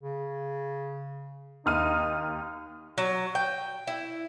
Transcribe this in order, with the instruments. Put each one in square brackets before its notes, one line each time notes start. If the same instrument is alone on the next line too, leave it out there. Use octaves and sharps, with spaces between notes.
[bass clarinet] C#3
[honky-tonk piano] D#2 F6 D#7 [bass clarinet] D#4
[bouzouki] F#3
G5
E4